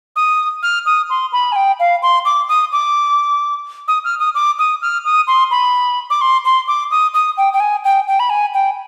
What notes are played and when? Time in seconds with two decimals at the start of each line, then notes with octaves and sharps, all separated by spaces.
0.16 D#6
0.63 F6
0.86 D#6
1.10 C6
1.33 B5
1.52 G#5
1.56 G5
1.80 F5
2.03 C6
2.25 D6
2.49 D#6
2.72 D6
3.88 D#6
4.04 F6
4.19 D#6
4.35 D6
4.59 D#6
4.82 F6
5.05 D#6
5.28 C6
5.51 B5
6.10 D6
6.21 C6
6.45 C6
6.68 D6
6.91 D#6
7.14 D#6
7.37 G5
7.53 G5
7.60 G#5
7.84 G5
8.08 G5
8.20 B5
8.30 G#5
8.54 G5